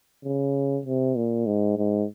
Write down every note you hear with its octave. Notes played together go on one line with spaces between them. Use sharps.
C#3
C3
A#2
G#2
G#2